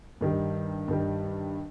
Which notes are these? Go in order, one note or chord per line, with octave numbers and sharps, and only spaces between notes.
G2 D#3 G3
G2 D#3 G3